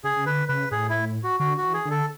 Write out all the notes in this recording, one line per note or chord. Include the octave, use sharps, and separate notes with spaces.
C#3 G#4
C#3
D3 B4
C#3 B4
A2 G#4
E4
F#4
D3 F#4
F#4
E3
G#4
D3
A4